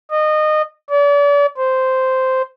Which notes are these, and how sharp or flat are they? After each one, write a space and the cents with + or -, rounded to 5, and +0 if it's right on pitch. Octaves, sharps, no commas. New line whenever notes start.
D#5 -20
D5 -40
C5 -5